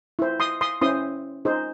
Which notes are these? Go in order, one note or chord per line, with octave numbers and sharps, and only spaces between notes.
E4 C5
C6 D#6
C6 D#6
C#4 E4 C5 C6 D#6
D#4 G#4 C5